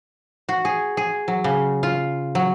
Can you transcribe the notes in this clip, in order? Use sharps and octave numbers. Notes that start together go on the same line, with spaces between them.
F#4
G#4
G#4
F#3
C#3
F4
F#3